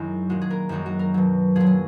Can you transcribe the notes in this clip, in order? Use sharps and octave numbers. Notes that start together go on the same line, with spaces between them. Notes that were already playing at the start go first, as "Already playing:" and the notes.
Already playing: F#2 D#3 G#3 E4 F#4
A#2 G#3 F#4
G#4
A#4
F#2 D#3 G#3 F#4
F#4
A#4
B2 F#3
A#2 F#3 G#4
G#4